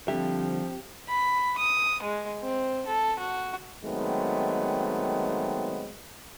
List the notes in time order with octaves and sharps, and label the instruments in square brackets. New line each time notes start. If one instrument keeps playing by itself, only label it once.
[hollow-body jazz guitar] D3 G3 E5 [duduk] F3 [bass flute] C4 [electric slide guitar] G4
[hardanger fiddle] B5
D#6
G#3
C4
A4
F#4
[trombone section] D#3 F#3 G#3 A3 B3 C4